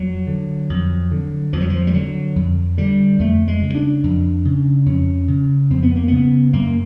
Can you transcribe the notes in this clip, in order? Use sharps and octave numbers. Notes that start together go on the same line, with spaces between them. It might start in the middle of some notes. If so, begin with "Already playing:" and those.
Already playing: F2 F#3
D3
F2
D3
F2 F3
F#3
F3
G3
D3 F#3
F2
D3 G3
F2 A3
G#3
C#3
D4
F2
C#3
F2 C#4
C#3
F2 C4
B3
A#3
C#3 B3
F#2 A#3